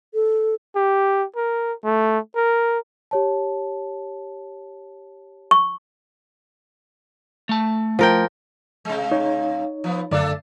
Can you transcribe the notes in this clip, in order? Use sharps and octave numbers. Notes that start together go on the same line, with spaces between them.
A4
G4
A#4
A3
A#4
G4 C#5 A5
C#6
A3 A5
F3 A#4 G5
C3 G#3
D#4 C#5
F3 B3
F#2 D3 A3 D4 A4 D5